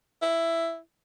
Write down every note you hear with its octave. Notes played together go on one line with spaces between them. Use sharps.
E4